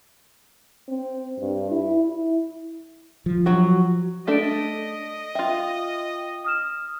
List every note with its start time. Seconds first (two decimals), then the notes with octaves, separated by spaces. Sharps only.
0.88 C4
1.39 G2
1.71 E4
2.00 E4
3.26 F3
3.46 F#3 F#4
4.27 A3 D4 A4 D#5 B6 D7
5.35 F4 E5 G5
6.44 D#6 F6 E7